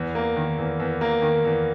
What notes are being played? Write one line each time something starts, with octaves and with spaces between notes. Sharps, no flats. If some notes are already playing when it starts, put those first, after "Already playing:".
Already playing: E2
A#3
D#3
E2
E2
A#3
D#3
E2